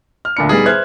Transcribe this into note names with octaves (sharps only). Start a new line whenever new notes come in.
F6
D2 A#2 D4 B5 C#7
G3 B3 D#4 G#4
B4 C5 E5 F6 F#6 G#6